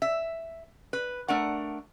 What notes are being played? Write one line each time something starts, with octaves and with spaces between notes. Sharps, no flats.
E5
B4
A3 D4 A#4 F#5